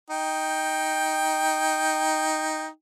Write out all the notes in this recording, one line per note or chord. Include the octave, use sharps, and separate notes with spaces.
D#4 G5